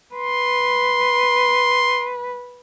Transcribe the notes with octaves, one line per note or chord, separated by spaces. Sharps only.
B4 C6